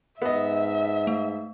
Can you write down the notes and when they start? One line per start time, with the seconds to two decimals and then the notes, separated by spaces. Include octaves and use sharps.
0.22 G#2 B3 D#5 E5
1.07 A3